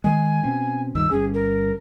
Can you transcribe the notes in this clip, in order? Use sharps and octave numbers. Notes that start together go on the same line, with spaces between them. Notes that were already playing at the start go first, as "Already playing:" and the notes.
D#3 G#3 G#5
B2 C4 C#4
C#2 G2 D#3 E6
G1 G2 C#4 G#4
A#4